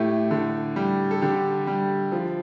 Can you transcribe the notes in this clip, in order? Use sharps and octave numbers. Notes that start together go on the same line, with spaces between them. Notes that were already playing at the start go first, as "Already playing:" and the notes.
Already playing: A2 A3 G4
D3
G3
A4
D3 G4
G3
F3